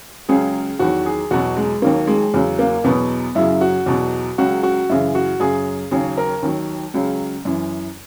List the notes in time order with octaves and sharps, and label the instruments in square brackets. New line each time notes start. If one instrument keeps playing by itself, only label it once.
[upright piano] C#2 C#3 F#3 G#4
E2 D#3 F#3 F#4
G#4
E2 B2 F#3 F#4
G#3
D#2 D#3 F#3 A#3
G#3
E2 C#3 F#3
A#3
E2 B2 F#3 B3
F#2 C#3 F#3 E4
F#4
E2 B2 F#3
C#2 C#3 F#3 F#4
F#4
F#2 C#3 E3 E4
F#4
F#2 C#3 F#3 G#4
D#2 C#3 F#3 G#4
A#4
D#2 D#3 F#3
C#2 C#3 F#3
F#2 E3